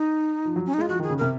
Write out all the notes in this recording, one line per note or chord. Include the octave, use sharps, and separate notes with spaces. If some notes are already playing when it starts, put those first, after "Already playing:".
Already playing: D#4
F3
F#3
C#4
D#4
G#3 F4
F3 F#4
D#3 G#4
C#3
C3 A#4